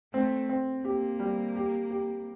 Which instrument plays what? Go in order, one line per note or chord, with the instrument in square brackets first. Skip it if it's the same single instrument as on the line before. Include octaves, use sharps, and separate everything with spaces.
[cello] A3 [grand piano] C4
[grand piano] C4
[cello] A#3 [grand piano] G4
[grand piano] G3
G4
G4